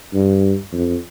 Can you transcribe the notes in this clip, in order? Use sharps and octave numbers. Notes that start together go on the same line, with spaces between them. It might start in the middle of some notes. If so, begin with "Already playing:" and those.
G2
F2